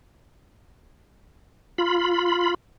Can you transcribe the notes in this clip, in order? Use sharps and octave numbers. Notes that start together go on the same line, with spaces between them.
F4 B5